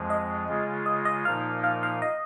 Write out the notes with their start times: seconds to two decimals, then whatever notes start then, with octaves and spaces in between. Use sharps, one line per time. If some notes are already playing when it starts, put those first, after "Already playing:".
Already playing: F2 F3 G#3
0.10 D#5
0.48 C#3 G#3 F4
0.86 D#5
1.05 D#5
1.25 A#2 F3 A#3 D#4 F5
1.64 F5
1.83 F5
2.02 D#5